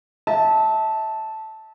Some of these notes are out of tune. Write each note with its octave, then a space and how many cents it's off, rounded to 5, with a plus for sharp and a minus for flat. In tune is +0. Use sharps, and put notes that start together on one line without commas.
E5 -35 A5 -5